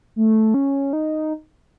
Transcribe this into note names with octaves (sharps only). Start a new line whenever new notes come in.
A3
C#4
D#4